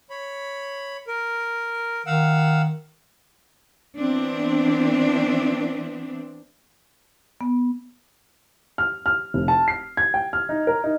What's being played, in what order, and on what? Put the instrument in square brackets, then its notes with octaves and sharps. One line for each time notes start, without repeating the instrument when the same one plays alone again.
[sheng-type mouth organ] C#5 B5
A#4
[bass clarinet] D#3 [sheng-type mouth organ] F5 F#5 E6
[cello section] E3 B3 C4 D4
[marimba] B3
[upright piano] F6
F6
F1
A5
C7
G#6
G5
F6
D#4
A#4
D#4